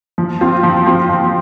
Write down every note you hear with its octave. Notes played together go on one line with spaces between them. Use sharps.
F3
C4 F4
F3
C4 F4
F3